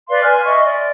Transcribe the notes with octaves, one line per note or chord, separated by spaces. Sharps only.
B4 D5 F5 C6
G#5 C6 F6
D#5 E5 C6 C#6
D5